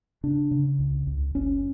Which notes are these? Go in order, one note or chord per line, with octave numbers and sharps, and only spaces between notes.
C#3 D4
C#3
C#2
C#2
F#1 C#4